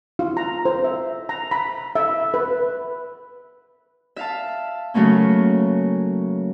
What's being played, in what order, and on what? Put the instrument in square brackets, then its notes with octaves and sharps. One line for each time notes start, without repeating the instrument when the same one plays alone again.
[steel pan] F4
A#5
C5
E5
A#5
B5
E5
B4
[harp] E5 F5 A5
C#3 F#3 A3 A#3 C#4